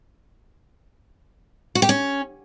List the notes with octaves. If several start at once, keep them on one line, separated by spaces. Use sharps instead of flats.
F#4
G4
C#4